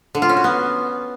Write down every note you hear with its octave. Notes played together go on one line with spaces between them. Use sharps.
D3
F4
C#4
F#4
B3